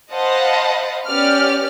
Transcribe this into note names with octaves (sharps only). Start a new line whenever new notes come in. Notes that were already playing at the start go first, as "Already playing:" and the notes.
C5 D#5 F5 F#5 A5 B5
B3 C#4 G4 D5 F6